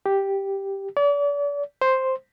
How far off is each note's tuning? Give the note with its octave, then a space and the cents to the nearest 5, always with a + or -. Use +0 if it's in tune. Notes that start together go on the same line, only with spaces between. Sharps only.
G4 +0
D5 -40
C5 +0